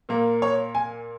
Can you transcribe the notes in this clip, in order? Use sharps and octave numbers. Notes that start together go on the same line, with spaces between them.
A#2 A#3
C#5
G#5